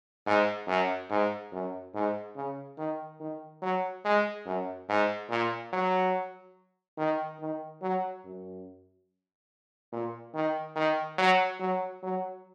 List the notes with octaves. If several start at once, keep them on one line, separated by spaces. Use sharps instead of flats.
G#2
F#2
G#2
F#2
G#2
C#3
D#3
D#3
F#3
G#3
F#2
G#2
A#2
F#3
D#3
D#3
F#3
F#2
A#2
D#3
D#3
F#3
F#3
F#3